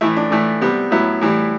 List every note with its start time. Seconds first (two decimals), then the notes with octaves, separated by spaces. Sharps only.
0.01 A2 E3 A3 E4
0.17 D4
0.31 A2 E3 A3 D4
0.61 C3 G3 B3
0.91 A2 F#3 B3 E4
1.21 A2 E3 G3